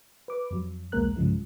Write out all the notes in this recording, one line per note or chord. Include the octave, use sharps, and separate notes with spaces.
B4 D6
F2 F#3
B1 E2 G#3 A#3 A#4 F#6
C2 G2 C#3 F3 G#3